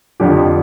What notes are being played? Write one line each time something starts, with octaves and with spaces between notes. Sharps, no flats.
F2 D3 F3 G4